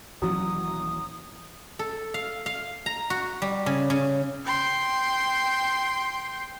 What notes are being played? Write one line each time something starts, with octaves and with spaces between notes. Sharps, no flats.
D#1 E3 F#3 C#4 D#6
A4
F5
F5
A#5
F#4
G3
C#3
C#3
G5 C6